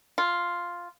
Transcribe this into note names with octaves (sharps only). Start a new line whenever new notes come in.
F4